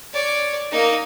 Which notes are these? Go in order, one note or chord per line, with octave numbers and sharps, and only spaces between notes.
C#5 D5
A#3 D#4